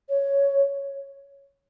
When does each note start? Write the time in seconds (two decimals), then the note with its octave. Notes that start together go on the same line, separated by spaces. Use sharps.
0.09 C#5